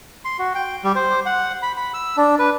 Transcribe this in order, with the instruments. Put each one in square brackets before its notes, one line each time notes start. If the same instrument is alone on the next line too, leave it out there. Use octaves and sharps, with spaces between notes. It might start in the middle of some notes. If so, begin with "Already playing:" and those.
[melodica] C6
F#4
G5
G3
C5
F#5
B5
B5
E6
D4
B4